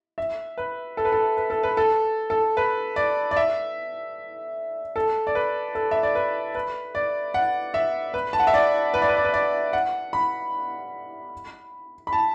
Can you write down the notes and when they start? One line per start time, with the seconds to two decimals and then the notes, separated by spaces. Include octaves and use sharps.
0.18 E5
0.58 B4
0.97 A4
1.05 B4
1.12 A4
1.37 B4
1.50 A4
1.63 B4
1.77 A4
2.30 A4
2.57 B4
2.96 D5
3.31 D5
3.37 E5
4.96 A4
5.27 D5
5.35 B4
5.75 A4
5.91 E5
6.03 D5
6.15 B4
6.55 B4
6.95 D5
7.34 F#5
7.74 E5
8.14 B4
8.33 A5
8.40 F#5
8.47 E5
8.54 D5
8.94 B4
9.02 D5
9.09 B4
9.17 D5
9.24 B4
9.34 D5
9.73 F#5
10.13 B5
12.07 B5
12.13 A5